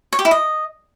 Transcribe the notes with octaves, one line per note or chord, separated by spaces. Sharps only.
C#5
G4
E4
D#5